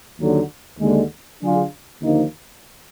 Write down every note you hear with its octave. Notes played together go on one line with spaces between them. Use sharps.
D#2 D3 F#3
D#2 D3 G#3
D3 F#3 D4 F4 G#4
D#2 D3 F3 A#3 D#4